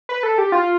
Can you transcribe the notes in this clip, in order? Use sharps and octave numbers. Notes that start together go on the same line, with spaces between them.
B4
A4
G4
F4